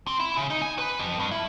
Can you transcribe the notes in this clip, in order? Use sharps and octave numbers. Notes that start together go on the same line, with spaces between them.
C4
E4
C#3
D#4
G#5
B4
F2
G2
E4